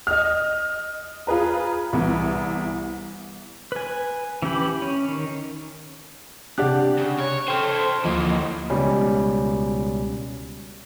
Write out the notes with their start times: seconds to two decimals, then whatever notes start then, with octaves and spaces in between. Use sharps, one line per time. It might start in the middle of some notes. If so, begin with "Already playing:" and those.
0.07 D#5 F6
1.27 F4 G#4 B4 A#5
1.93 C2 E3 B3
3.72 B4 G#5
4.42 E3 C#4 G4 B5
4.82 C#4
5.08 D#3
6.58 C3 D4 G4 D5 F#5 F#6
6.99 C#3
7.19 C#5
7.48 A4 C5 G5 F6
8.05 D2 E3 F3 A#3 D#5
8.70 C#2 B2 G3 C#4